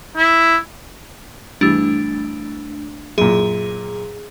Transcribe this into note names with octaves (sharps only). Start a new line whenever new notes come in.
E4
G2 E3 A3 D4
F#2 A#2 G#4